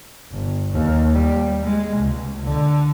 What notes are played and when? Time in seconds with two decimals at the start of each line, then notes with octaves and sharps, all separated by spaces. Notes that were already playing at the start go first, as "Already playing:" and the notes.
0.32 G1
0.72 D#2
1.12 G3
1.64 G#3
1.96 C#2
2.44 D3